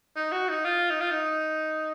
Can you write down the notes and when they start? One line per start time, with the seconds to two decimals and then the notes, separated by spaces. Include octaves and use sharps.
0.16 D#4
0.32 F#4
0.49 D#4
0.65 F4
0.90 D#4
1.01 F4
1.11 D#4